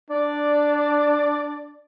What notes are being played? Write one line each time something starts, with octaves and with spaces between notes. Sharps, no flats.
D4 D5